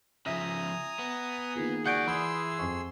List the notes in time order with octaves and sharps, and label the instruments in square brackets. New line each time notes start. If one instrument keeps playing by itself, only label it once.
[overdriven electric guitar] C#3 F3 [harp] E5 [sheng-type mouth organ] G#5 A#5 D#6 [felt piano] A#6
[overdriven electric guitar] B3
[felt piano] D#3 A#3 F4 [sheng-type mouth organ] G#4
[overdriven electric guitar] C#2 D5 [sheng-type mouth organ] F#4 G#4 [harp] F#5 G6 D7
[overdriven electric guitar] E3 [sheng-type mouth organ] G#4 C6 E6 [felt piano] B5 D#6
[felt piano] F2 G#5 C#6